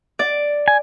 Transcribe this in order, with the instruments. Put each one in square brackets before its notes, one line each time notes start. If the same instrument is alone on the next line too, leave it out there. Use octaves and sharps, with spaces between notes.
[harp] D5
[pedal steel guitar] G#5